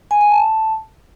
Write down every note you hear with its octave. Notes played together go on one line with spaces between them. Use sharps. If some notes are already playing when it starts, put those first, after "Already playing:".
G#5
G#5
A5